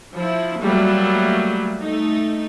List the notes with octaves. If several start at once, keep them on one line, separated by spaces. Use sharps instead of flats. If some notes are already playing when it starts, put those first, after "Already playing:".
F3 E4
F#3 G3 A3 A#3
A3 D#4